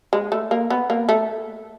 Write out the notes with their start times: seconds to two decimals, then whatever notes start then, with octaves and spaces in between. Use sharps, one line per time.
0.13 G#3
0.32 A3
0.51 A#3
0.70 B3
0.90 A#3
1.09 A3